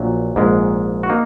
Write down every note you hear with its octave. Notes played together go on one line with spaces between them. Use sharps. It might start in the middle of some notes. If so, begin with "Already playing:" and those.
Already playing: A#1 A#2 F#3
A#1 G#2 G#3
F#4
A#3 D#4